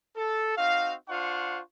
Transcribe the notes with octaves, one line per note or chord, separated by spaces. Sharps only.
A4
C4 D#4 F#4 F5
D4 F4 C5 F5 F#5 C#6